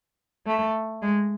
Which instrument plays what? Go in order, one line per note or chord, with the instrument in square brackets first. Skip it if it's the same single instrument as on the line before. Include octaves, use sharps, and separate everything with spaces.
[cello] A3
G#3